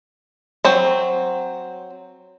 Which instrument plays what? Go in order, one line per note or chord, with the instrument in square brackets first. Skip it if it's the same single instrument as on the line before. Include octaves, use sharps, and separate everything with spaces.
[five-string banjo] F#3 C4